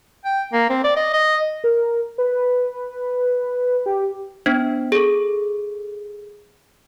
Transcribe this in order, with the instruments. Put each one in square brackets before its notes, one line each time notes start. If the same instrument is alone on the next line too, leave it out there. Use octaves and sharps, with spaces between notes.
[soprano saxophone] G5
A#3
C4
D5
D#5
D#5
[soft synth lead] A#4
B4
G4
[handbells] B3 D4 C5
G#4 A4